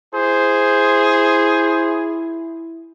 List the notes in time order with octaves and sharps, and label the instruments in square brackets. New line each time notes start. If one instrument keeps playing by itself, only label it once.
[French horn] E4 [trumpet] G#4 [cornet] C5